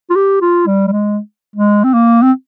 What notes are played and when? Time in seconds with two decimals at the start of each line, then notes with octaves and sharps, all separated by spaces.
0.10 F4
0.15 G4
0.41 F4
0.67 G3
0.87 G3
0.92 G#3
1.56 G#3
1.84 C4
1.93 A#3
2.22 C4